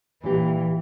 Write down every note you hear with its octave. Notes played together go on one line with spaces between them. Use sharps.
A#2 E3 G4